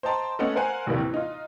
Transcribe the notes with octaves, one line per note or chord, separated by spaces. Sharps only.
C5 D#5 G5 A5 A#5 C6
A3 B3 C#4 D#5 F#5
A#4 C5 F5 F#5 G#5 F#6
A#1 D#2 A2 C3 A#3
E3
D#4 F4